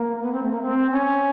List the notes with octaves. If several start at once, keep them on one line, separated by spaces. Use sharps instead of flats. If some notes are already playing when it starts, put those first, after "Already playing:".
Already playing: A#3
B3
C4
A3
A#3
C4
C#4